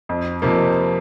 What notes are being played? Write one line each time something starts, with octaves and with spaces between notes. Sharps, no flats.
F2
C3 F3 A#3